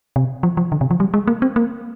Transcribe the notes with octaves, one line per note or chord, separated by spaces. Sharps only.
C3
F3
F3
D3
C3
F3
G3
G#3
A#3
C4
A#3